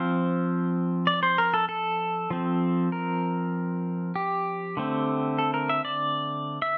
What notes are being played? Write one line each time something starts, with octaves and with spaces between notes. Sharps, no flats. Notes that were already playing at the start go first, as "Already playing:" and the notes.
Already playing: F3 C4 F5
D5
C5
A#4
A4
A4
F3 C4
A#4
G4
D3 A3 C4
A4
A#4
E5
D5
E5